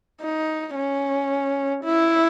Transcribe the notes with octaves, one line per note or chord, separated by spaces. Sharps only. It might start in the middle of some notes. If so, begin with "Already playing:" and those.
D#4
C#4
E4